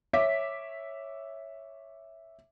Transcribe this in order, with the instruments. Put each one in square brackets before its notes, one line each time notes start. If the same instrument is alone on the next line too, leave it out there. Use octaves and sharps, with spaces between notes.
[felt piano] C#5 E5 D6 B6